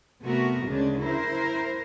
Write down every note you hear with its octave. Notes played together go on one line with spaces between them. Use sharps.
C3 A3 B3 F#4 A#4
D2 C#3 G#3 D4
E4 A#4 C5